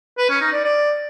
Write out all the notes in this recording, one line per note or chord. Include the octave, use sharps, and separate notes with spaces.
B4
C#4
D#4
D5
D5